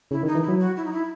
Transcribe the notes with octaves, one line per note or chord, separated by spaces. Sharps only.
C#3 E4
D#3
D#4
E3
E4
F#3
F#4
E4
D#4
E4